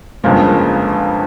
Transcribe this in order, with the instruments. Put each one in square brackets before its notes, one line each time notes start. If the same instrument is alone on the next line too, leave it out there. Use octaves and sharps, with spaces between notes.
[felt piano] G1 F2 C#3 F3 A#3 [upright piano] G#3